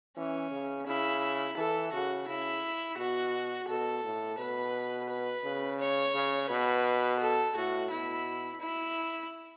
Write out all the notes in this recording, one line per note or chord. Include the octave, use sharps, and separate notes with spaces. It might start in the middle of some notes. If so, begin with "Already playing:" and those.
E3 C#4
C#3
C#3 E4
E3 A4
C#3 F#4
C#3 E4
B2 F#4
B2 A4
A2
B2 B4
B4
C#3
C#5
C#3
B2 B4
A4
A2 F#4
B2 E4
E4